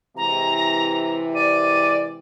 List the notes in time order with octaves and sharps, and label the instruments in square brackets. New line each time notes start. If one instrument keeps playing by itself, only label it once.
[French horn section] C3 E3 G#3 [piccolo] A#5
[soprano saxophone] D5 [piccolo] D#7